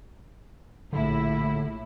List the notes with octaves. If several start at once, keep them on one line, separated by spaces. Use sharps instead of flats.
A#1 A2 D3 E4